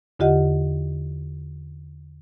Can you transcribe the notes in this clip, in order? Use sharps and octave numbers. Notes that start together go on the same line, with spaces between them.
E2 D3 F4 G4 D#5 F#5